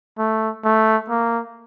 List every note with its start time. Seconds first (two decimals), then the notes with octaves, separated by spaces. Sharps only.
0.18 A3
0.65 A3
1.10 A#3